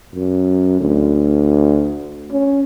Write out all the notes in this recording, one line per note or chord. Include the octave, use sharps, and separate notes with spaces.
F#2
D2
C#4